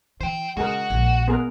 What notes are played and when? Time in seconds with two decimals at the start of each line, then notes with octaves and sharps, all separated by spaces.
0.21 E3 C5 G5
0.57 C#3 G#3 F#4 G#4 A#4
0.90 A#1
1.28 B3 G#4 A#4